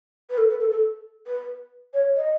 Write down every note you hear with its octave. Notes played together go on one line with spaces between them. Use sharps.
B4
A4
B4
A4
A4
B4
C#5
D#5